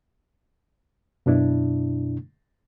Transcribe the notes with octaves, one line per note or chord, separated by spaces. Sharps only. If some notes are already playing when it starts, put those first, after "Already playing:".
F#2 B2 D4 E4